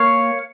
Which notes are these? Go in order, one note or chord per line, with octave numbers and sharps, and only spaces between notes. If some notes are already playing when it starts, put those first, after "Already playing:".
Already playing: A#3 C#5 F5